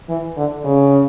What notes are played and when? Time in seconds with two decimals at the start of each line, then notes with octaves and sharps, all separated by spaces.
0.09 E3
0.37 D3
0.65 C#3